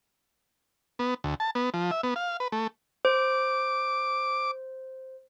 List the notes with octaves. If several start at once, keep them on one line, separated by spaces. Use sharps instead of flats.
B3
D2
A5
B3
F3
E5
B3
F5
B4
A3
C5 D6